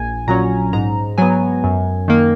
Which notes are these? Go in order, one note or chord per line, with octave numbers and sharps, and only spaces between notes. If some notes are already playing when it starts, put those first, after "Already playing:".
Already playing: A#1 G#5
A#2 F#3 C#4 A#5
G#2 A#5
F#3 B3 G#5
F#2
D#3 A#3